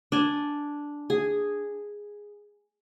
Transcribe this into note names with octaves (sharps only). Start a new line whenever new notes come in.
D4 G#5
G#4